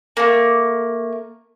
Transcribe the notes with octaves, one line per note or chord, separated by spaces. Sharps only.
A3 A#3